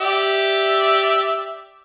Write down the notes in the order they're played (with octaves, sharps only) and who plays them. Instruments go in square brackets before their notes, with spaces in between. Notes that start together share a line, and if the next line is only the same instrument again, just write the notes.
[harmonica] G4 D5 E5